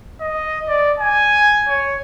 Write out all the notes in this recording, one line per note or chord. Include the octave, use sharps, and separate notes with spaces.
D#5
D5
G#5
C#5